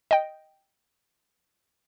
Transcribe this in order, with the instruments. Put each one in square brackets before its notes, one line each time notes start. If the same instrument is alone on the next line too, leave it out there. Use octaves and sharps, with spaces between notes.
[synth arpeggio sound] D#5 G5